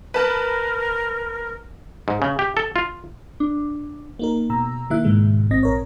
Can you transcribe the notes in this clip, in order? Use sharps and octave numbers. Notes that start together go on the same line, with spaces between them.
A#4 B4 A5
G#2
C#3
G4
A4
F4
D4
A#3 D#4 A#4
B2 A#5 E6
D#3 A#3 E4 E5 F#6
G#2 B2 D#3 G#3
A1 C4 D#5 A#6
A#1 A#4 C#5